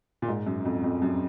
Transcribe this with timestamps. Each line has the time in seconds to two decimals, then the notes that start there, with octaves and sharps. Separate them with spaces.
0.22 A#2
0.28 G#2
0.47 F#2
0.65 F2
0.84 F2
1.02 F#2